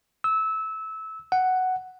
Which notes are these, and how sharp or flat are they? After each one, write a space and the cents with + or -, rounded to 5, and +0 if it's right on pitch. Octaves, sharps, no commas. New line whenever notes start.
E6 -20
F#5 +5